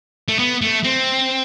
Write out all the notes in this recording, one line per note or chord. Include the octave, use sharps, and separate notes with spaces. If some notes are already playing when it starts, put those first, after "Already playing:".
A3
B3
A3
C4